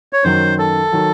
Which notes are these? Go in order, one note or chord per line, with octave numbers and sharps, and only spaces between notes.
C#5
F#2 D#3 F#3 C5
A4
D#3 F#3